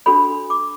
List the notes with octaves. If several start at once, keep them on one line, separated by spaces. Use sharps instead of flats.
D4 F#4 A4 C#5 B5
D6